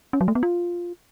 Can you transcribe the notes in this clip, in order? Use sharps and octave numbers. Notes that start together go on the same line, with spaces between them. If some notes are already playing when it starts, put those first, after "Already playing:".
C#4
F#3
A3
B3
F4